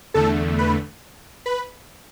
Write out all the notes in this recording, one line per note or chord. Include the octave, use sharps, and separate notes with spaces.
E2 D3 A3 A4 A5
B4 B5
B4 B5